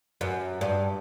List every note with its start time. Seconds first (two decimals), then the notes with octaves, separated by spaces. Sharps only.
0.21 F#2
0.61 G2